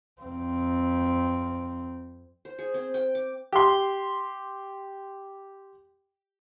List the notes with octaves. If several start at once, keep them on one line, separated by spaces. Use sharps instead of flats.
F2 C4
C5
G#4
C4
G5
D6
G4 C6